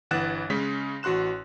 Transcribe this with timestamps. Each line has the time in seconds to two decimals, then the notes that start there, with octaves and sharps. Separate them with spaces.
0.11 G1 E3 F#5 F#6 A6 E7
0.50 C#3 G#3 C#4 B6
1.03 A1 F#4 C6 F#6 E7